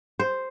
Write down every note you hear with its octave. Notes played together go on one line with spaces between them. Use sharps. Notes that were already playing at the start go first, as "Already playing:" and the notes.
C5